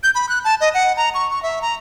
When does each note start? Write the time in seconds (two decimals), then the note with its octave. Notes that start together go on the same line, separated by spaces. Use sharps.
0.03 G6
0.15 B5
0.29 F#6
0.45 A5
0.61 D#5
0.74 F#5
0.97 A#5
1.14 C#6
1.31 C#6
1.43 E5
1.62 A#5